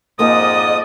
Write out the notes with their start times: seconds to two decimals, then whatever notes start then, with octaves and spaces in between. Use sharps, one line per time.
0.19 F2 G#2 A#3 A#4 D5 D#5 G#5 D#6